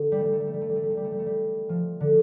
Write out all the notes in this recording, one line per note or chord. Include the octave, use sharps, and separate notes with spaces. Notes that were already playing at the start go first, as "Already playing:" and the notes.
Already playing: D3
G3
A3
G3
A3
G3
A3
G3
A3
G3
A3
G3
A3
G3
A3
G3
A3
G3
F3
D3